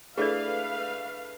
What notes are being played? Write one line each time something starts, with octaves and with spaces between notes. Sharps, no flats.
A3 D4 E4 G#4 A4 B4 D5 F5